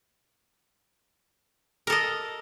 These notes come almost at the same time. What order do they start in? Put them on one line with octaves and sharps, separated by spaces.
A#4 A4 D#5